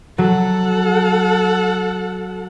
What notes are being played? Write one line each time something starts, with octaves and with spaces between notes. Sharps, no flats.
F#3 A4 F#5